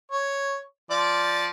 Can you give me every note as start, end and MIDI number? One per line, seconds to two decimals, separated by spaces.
0.12 0.60 73
0.90 1.50 53
0.90 1.50 74